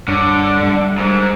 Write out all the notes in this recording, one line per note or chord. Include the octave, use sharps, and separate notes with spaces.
G2 D3 C#5 D5
G3 D5 E5
G#2 G3 A#4 A#5